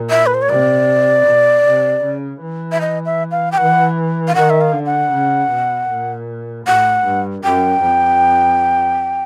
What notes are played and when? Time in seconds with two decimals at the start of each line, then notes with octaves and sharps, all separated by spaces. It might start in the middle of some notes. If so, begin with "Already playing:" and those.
Already playing: A#2
0.10 E5
0.26 B4
0.34 C5
0.42 C#5
0.49 C3 D5
1.26 B2
1.65 C3
2.03 C#3
2.42 E3
2.72 E5
2.81 D#5
3.06 E5
3.31 F5
3.52 G5
3.58 E3 F#5
4.28 F5
4.35 D#3 F#5
4.50 E5
4.61 F5
4.73 D3
4.86 F#5
5.12 C#3
5.51 B2
5.89 A#2
6.66 A2 F#5
7.04 G2
7.44 F#2 G5
7.81 F2